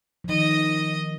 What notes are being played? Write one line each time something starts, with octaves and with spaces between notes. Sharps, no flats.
F3
D#3 D#5